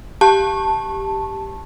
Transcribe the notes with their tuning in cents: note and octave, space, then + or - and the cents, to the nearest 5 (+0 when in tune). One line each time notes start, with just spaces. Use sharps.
G4 +0 A5 +0 C#6 -20